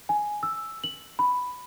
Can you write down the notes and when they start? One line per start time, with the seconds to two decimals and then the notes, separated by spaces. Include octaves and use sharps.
0.09 G#5
0.43 E6
0.84 F#7
1.19 B5